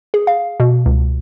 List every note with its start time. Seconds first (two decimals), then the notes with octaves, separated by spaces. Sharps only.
0.14 G#4
0.27 F5
0.60 B2
0.86 C#2